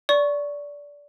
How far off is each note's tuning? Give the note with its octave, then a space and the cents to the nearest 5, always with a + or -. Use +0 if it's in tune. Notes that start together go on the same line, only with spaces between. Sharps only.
D5 -20 C#6 +0